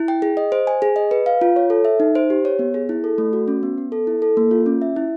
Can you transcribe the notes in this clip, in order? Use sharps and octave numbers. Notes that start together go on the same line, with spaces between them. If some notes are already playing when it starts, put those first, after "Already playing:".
Already playing: E4
G5
G#4
D#5
C5
G#5
G#4
D#5
B4
F5
F4
C#5
A4
E5
D#4
C5
G4
C#5
B3
G#4
E4
A4
A3
F#4
C#4
B3
B3
A4
E4
A4
A#3
F4
C#4
E5
E4